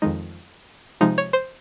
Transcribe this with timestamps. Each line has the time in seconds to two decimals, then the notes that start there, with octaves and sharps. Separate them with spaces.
0.02 F2 D#3 G#3 D#4
1.01 C3 F3 G#3 D#4
1.18 C#5
1.33 C5